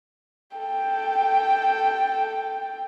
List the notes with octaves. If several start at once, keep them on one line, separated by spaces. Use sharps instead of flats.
A4 G5